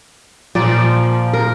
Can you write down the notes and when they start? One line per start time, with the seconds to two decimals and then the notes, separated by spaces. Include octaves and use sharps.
0.55 A#2 F3 D5
1.33 A#4